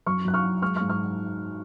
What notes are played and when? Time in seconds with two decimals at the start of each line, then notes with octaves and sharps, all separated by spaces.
0.06 F#2 C#6 F6
0.25 F#2 F#6
0.34 C#6 F6
0.43 F#2
0.62 G#3 C#6 F6
0.76 C#6 F6
0.81 G#2
0.89 C#6 F6